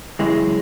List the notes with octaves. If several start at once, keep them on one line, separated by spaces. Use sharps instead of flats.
F#2 C#3 E3 G#3